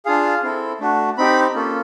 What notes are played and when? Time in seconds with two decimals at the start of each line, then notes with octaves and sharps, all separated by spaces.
0.05 D4 F4 G#4 F5
0.43 C4 E4 A4
0.80 A3 D4 F#4
1.18 C4 D#4 G4 B5
1.55 A#3 C#4 F4 A4